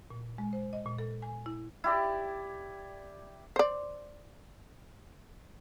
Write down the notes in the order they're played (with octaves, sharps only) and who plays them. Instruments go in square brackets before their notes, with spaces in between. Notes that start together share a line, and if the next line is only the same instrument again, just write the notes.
[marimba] A#2
G#3
C5
D#5
A#2
A4
G#5
E4
[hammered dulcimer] E4 G4 D5
[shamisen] C5 D5